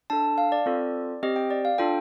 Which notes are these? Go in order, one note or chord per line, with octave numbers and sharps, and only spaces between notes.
D4 A4 A5
A5
F5
D5
C4 F4 A4
C4 G4 D#5
G5
D5
F5
D4 F4 A4 G5